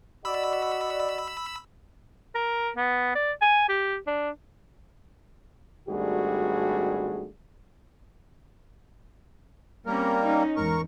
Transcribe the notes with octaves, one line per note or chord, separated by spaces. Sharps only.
F#4 D5 D#5 B5 E6
A#4
B3
D5
G#5
G4
D4
G#1 G3 A3 D4 F#4 G#4
G3 A#3 C4 C#4 A#4
C#4 D#4
E2 G#2 A#4 C#6